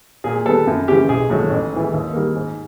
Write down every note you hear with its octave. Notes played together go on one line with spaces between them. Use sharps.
A#2 G#4
G3 B3 A4
F#2
C#3 E3 G4
B1 G#4
A2 F#3
A1
G#2 E3
D#2
D#3 G3 A#3
G#2